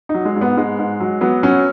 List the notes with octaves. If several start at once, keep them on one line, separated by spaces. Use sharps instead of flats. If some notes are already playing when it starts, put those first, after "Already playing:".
D#4
F#3
G#3
G#2
B3
G#2 G#3
G#2
F#3
F#3 B3
F#3 C#4